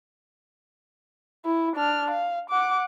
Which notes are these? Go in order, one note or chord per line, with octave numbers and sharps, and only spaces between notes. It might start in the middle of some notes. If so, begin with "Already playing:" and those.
E4
D4 F6
F5
F#5 D6